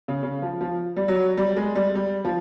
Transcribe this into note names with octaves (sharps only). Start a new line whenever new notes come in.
C#3
C#3
F3
F3
G3
F#3
G3
G#3
G3
G3
F3